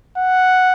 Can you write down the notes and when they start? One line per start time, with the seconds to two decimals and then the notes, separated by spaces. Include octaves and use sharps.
0.18 F#5